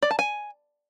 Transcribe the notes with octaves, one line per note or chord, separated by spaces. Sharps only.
D5
A5
G#5